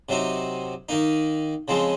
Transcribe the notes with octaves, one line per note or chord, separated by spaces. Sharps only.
C3 F#3 C4 D#4
D#3 A#3 D#4
C#3 F3 G#3 C4